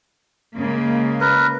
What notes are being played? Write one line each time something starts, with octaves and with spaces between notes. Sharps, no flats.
C#3 G#3 A#3
A#4 B4